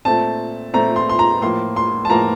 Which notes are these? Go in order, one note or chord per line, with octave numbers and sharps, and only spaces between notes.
A#2 A3 C4 A5
A#2 A3 C4 A#5
C6
C6
A#5
A2 F3 A#3 C6
C6
A5
A2 F3 A#3 A#5